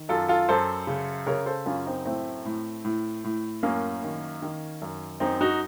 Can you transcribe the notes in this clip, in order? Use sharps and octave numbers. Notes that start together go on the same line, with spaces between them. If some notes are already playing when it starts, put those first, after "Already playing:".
Already playing: D#3
F#2 F4 A4
F4 A4
F#2 A4 C5
C#3
C#3 A#4 C#5
A4 C5
F#2 C#4 F4
C4 D#4
A2 A3 C4
A2
A2
A2
F#2 A#3 C#4
D#3
D#3
F#2
F#2 C4 D#4
D#4 F#4